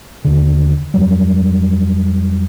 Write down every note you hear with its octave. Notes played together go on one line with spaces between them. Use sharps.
D#2 D3
F2 F#3 G3